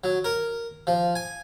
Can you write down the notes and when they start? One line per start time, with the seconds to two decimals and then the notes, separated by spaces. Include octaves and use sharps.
0.04 F#3
0.24 A#4
0.87 F3
1.15 G#5